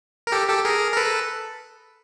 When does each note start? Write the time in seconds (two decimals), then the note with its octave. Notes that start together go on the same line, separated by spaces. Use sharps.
0.27 A#4
0.32 G4 A4
0.49 G4 A4
0.65 G#4 A#4
0.93 A#4
0.97 A4 B4